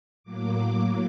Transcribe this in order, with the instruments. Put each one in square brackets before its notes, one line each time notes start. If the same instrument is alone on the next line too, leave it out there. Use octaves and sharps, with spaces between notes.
[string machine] A2 F#3 A#3 D6